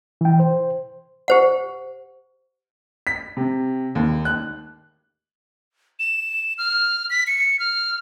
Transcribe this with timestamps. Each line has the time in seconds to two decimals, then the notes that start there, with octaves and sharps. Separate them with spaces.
0.21 E3 G5
0.40 C5
1.28 G4 C5 F#5
3.07 B6
3.37 C3
3.95 D#2
4.25 F#6
5.99 E7
6.58 F6
7.10 B6
7.27 C#7
7.59 F6